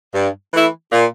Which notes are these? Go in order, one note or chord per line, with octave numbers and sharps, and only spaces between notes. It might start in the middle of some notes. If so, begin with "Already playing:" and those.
G2
E3 A3 E4
A#2